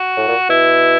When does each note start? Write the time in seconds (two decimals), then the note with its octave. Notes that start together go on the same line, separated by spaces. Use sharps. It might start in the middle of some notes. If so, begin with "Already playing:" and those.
Already playing: F#4
0.17 A2
0.28 A#2
0.49 B2 E4